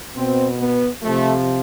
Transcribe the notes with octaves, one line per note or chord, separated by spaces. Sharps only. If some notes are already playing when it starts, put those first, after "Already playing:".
B2 C4
B3
C3 F3 A3